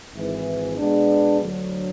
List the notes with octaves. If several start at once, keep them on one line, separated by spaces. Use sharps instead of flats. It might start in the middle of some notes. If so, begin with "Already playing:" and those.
G#1 G#2 E3
B2 G#3 B3 D4
D2 D3 F#3